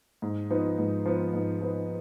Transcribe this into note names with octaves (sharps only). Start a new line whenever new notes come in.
G#2
F3 B3 D#4
G#2
F3 B3 D#4
G#2
F3 B3 D#4